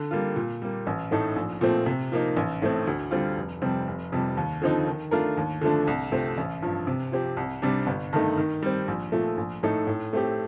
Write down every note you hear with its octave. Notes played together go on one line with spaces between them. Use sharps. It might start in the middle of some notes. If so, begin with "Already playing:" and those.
Already playing: D3
G3 A#3 F4
A#2
G3 A#3
A1
A2 A3 D#4 A4
A#1
A#2 F3 A3 C4
C3
F3 A#3 D#4
A1
A2 A3 C4
D2
D3 G3 C4 F4
F1
F2 C3 G3 C4
F1
F2 C3 G3
D#2
D3 F3 C4 D#4
D#3
A3 D4 F4 A#4
D#2
D3 F3 A3 D4
C2
C3 F3 A3 C4
A1
G2 F3
C3
F3 C4 G4
C2
C3 G3 D4
G1
G2 D#3 A3 D#4
D#3
G3 C4
A#1
A#2 F3 A3
A#1
A2 A3 D#4 A4
A2
A3 C4 G4